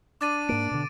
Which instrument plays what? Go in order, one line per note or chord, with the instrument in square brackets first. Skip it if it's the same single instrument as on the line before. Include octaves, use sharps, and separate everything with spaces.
[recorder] D4 [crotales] D6 A6 D#7
[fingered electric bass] G#2 A#3 [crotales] D7
[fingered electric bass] B2 D3